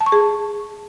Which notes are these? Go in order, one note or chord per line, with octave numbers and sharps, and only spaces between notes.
A5
C#6
G#4